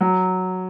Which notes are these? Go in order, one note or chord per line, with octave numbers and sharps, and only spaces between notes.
F#3